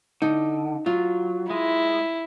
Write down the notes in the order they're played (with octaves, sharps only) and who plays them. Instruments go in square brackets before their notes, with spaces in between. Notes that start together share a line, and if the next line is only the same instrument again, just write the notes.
[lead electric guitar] D3 [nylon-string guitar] D#4
[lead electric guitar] F#3 [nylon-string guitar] F4
[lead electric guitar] G#3 [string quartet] E4